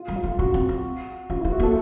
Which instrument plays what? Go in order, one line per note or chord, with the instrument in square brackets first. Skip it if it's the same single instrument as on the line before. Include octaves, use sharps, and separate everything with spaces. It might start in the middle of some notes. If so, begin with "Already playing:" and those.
Already playing: [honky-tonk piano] F4
[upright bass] G3
[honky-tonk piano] F4
[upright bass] A3
[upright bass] C#4 [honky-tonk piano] F#4
[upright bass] C4
C4
[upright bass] C#4 [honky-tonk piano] F4
[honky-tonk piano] E4
[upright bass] B3
[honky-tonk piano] F#4
[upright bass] A#3
[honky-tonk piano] A4